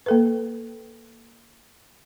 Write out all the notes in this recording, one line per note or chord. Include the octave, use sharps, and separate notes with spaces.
A#3 A4 B4